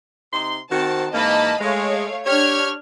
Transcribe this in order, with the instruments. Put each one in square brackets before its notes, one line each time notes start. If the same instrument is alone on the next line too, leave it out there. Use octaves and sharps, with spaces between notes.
[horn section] C3 D#4 C6
[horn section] D#3 F#4 [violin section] C4 A5
[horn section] G#2 E3 A#3 [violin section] D#5 A5 B5
[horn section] G#3 [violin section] A3 C#5 F5
[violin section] D4 F6 G#6 [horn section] G4 C#5